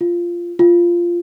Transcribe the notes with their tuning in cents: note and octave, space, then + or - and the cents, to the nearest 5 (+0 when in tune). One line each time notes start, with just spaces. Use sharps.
F4 -10
F4 -10